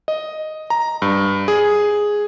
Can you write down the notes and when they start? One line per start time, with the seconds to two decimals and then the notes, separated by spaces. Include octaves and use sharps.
0.08 D#5
0.70 A#5
1.02 G2
1.48 G#4